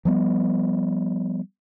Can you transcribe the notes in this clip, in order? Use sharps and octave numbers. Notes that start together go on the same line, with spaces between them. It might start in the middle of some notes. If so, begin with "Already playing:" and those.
F3 G3 B3